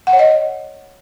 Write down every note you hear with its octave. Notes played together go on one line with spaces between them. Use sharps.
F#5
C#5
D#5